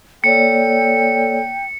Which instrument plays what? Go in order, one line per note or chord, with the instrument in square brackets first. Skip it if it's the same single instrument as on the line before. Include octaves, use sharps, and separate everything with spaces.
[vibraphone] A#3 C#5 D5 [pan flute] A4 [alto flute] G5 [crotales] C#7